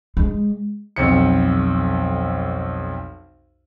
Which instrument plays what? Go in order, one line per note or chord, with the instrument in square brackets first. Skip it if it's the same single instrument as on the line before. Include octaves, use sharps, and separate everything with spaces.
[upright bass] G#3
[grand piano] B1 F2 C#7